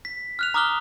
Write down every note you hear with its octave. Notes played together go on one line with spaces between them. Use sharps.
B6
F6 F#6 F7
A#5 D6 D#6 F6 F#6 G7